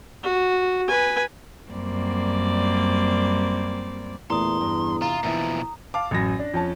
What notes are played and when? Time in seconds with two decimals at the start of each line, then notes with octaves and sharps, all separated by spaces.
0.23 F#4
0.88 B4 G#5
1.70 F#2 G3 A#3 C4 D5
4.30 E2 A#2 A3 A#5 C6 D#6
4.61 G2
5.02 C3 F4 A#5
5.23 D#2 B2 E3 F3 E5
5.94 F5 A5 D6
6.11 A1 F#2 A#6
6.39 D4
6.54 F2 C#4 A5